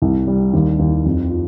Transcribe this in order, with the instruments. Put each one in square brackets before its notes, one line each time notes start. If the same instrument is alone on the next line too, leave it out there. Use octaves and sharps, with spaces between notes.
[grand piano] C2
G3
D#2
D#2
F2
F4